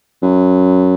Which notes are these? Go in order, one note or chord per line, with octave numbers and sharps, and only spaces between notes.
F#2